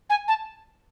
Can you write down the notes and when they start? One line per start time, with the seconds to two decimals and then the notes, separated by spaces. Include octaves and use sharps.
0.10 G#5
0.28 A5